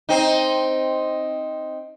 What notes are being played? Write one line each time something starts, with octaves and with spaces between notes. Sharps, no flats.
C4 D#4